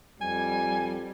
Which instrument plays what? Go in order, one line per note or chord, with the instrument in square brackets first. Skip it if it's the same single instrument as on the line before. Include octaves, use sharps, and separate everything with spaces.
[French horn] F2 [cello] G3 [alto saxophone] G#5